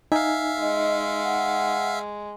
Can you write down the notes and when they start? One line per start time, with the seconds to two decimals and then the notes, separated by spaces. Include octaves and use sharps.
0.12 D#4 E5 F5 G#5
0.61 G#3 D#5
1.24 F#5